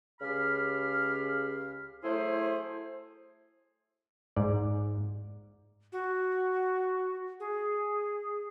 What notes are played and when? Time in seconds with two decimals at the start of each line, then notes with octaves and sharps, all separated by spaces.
0.21 C#2 C#3 G4 F5 B5 F6
2.03 F#3 A3 E4 G#4 C5
4.36 G#2 D5
5.92 F#4
7.40 G#4